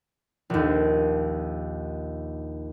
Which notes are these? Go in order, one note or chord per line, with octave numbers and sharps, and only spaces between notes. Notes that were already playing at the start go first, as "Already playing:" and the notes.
A#1 D#2